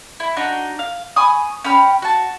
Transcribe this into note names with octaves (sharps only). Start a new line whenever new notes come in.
E4
D4 D#4 F#4
F5
G#5 B5 C#6 D#6
C#4 G5 B5 F6
F#4 A5